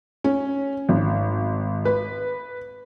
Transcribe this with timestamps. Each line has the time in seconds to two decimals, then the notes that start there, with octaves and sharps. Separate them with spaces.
0.24 C#4
0.89 G#1
1.85 B4